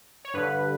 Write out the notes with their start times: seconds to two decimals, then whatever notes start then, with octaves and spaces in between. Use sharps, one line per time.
0.25 C#5
0.34 G2 D3 B4